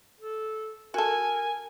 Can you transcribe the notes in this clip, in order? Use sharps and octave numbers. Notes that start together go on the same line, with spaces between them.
A4
F#4 A4 A#4 G#5